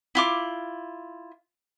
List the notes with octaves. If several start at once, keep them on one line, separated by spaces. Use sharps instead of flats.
E4 F4 D6